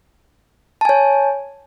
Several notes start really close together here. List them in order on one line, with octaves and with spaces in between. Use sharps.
A5 G#5 C#5